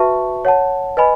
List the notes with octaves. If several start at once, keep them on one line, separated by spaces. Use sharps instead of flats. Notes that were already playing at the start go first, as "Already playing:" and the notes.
Already playing: F#4 B4 E5 A5 C#6
C#5 F#5 A5
B4 D#5 G#5 B5